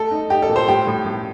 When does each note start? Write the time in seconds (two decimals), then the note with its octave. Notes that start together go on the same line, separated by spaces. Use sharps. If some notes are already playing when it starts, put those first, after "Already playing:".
Already playing: A3 A4
0.11 D#4
0.30 D#4 G4
0.42 A4
0.49 A#2
0.56 C5
0.68 A2 G4
0.87 A2
1.06 A2